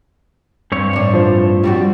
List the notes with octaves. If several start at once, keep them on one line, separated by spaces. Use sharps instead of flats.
G2 C4 C#5
A2 D4
F3 C5
G3 C4 F#4